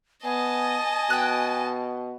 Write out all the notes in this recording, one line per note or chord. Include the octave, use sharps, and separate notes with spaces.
B3 D#5 G#5 A5
B2 G5 F#6